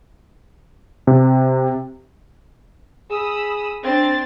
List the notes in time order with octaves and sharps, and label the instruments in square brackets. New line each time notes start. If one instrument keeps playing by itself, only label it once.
[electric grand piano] C3
[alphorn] G#4 [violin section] B5 D#6 E6
[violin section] C4 D4 A6